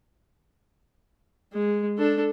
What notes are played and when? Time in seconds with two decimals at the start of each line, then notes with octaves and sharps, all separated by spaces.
1.53 G#3
1.98 D4 A4